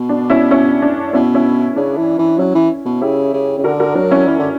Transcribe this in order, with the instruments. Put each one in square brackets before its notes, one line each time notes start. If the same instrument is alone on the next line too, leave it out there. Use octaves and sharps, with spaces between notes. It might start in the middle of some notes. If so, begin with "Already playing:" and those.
Already playing: [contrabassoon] B2
[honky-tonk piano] D4
C#4 E4
C#4 E4
D4
[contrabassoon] B2 [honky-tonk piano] C#4 E4
[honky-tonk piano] C#4 E4
[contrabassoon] C#3 [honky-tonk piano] D4
[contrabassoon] E3
E3
[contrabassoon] F#3 [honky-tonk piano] C#4 E4
[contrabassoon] E3
B2
[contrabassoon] C#3 [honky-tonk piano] E4 G4
[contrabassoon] C#3
C#3
[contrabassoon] D3 [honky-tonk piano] F#4 A#4
[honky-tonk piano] F#4 A#4
[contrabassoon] F#3 [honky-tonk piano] D4
[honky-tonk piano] C#4 E4
[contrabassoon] E3
D3